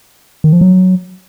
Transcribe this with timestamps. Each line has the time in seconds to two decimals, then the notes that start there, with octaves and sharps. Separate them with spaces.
0.44 D#3
0.53 F3
0.61 F#3